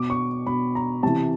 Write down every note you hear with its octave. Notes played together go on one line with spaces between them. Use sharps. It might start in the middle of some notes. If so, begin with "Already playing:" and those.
Already playing: B2 D6
C#6
B2 B5
A#5
C3 E3 A5